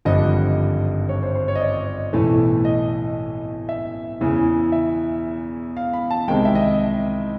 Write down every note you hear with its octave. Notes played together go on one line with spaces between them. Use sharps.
G#1 G2 D3 F3 D#5
C#5
C5
C5
C#5
D#5
D5
B1 A2 E3 A3
D#5
E5
E2 C#3 E3
E5
F5
B5
A5
C2 C3 D#3 G#3 G5
E5
D#5
E5